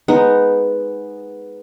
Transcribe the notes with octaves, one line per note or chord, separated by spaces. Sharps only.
G#3 B3 D#4